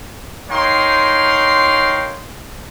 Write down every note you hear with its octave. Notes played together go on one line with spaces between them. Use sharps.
D#4 A#4 C#5 F5 G5 C6